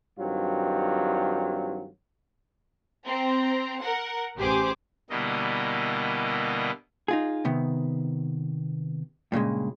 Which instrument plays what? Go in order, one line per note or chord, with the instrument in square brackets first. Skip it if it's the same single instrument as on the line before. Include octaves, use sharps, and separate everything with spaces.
[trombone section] G2 D#3 F#3 C4 F4
[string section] C4 A#5
A#4 F#5
A1 G4 G#4 C5 D6
[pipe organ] B2 D3 G3 A#3 E4 D#5
[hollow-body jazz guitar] D#4 F4 G#4
C3 D#3 B3
G2 A#2 C#3 G#3